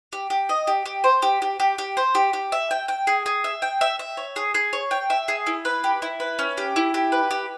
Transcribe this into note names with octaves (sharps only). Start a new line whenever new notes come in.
G4
G4
D#5
G4
G4
C5
G4
G4
G4
G4
C5
G4
G4
E5
G5
G5
G#4
G#4
E5
G5
E5
E5
C#5
G#4
G#4
C#5
G5
E5
G#4
E4
B4
G4
E4
B4
C#4
G4
E4
G4
B4
G4